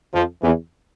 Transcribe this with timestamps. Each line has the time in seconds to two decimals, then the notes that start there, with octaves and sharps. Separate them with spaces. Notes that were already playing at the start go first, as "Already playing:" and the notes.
0.14 F2 F3
0.42 E2 E3